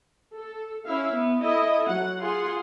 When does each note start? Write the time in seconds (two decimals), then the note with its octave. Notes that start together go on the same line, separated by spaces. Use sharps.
0.36 A4
0.85 C#4 E4 E5 F5
1.14 B3
1.43 E4 A4 D#5
1.89 F#3 F#5
2.20 F4 G#4 F#5 C6